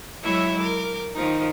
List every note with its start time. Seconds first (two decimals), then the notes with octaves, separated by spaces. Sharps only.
0.23 F#3 G#3 E4 C#5 E5
0.59 A#4 D6
1.15 D#3 F3 D#4